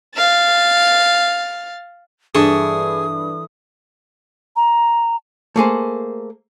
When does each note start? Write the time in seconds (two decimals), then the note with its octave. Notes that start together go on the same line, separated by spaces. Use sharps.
0.16 F5 A6
2.35 G2 E3 G#4 A4 C#6 D#6
4.56 A#5
5.56 A3 A#3 G#4 C5